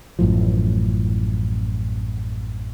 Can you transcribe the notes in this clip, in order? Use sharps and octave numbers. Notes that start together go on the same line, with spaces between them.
A1 F#2 A2 F3